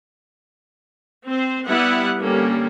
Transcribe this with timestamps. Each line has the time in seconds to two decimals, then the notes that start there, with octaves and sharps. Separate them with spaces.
1.25 C4 C5
1.68 G3 B3 E4 B4 F#5
2.20 D3 G3 A#3 C#4